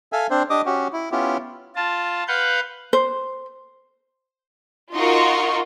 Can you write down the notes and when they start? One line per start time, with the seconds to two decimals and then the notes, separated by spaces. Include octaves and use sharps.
0.12 A4 E5 F5 G#5
0.30 C4 D4 C5
0.50 D4 G4 D#5 D6 D#6
0.66 C#4 F#4 G4
0.93 E4
1.12 B3 C#4 E4 F4 G4
1.76 F4 A5
2.28 B4 F5 F#5 G6
2.93 C5
4.94 D#4 F4 F#4 A#4 C6 C#6